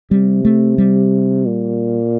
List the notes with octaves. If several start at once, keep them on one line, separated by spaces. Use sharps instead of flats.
C3 G3
A3
G3
A#2